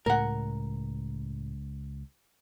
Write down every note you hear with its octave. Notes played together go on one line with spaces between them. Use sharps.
C#2 A2 A#4 F#5